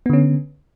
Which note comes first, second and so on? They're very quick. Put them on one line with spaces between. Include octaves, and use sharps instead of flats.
B3 D3 C#4